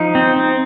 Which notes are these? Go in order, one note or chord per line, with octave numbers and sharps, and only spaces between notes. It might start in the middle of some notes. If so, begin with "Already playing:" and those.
Already playing: F3 D#4
C4
C4